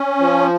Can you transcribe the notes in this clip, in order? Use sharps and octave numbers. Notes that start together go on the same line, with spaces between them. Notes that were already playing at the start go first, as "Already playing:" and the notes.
Already playing: C#4
F3